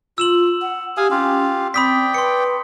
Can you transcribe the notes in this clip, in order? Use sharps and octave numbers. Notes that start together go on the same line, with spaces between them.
F4 E6 E7 F#7
F#5
G4 F5 G#5 D#6
C#4 F4 G4 F5
C4 D5 G5 B5 D#6 B6
B4 C6 C#7